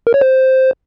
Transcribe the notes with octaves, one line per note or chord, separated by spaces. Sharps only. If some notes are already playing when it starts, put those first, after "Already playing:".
A#4
C#5
C5